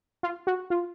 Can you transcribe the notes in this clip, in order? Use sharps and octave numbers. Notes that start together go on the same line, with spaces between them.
F4
F#4
F4